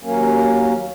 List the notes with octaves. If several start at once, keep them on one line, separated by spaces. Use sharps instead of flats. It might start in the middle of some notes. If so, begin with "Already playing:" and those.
D#2 F#3 A#3 C#4